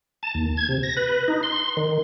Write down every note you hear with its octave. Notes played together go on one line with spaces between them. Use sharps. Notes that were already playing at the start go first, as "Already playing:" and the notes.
A5
D#2
G#6
C3
A#6
B4
D#4
C6
D#3